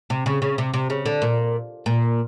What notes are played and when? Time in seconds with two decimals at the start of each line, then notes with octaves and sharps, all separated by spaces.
0.10 C3
0.26 C#3
0.42 C#3
0.58 C3
0.74 C3
0.90 C#3
1.06 D3
1.22 A#2
1.86 A#2